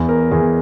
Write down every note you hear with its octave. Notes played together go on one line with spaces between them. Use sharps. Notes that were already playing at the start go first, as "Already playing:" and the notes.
Already playing: E2
A#4
E2 G#4